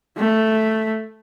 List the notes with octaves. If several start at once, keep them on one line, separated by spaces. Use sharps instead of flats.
A3